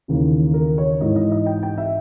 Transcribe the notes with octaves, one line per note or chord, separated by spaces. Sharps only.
D#2 C#3 E3
A#4
C#5
G#2 E3 D#5
D#5
D#5
G5
G5
E5